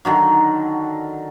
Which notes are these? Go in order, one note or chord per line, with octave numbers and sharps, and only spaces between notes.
D3 D#3 F#3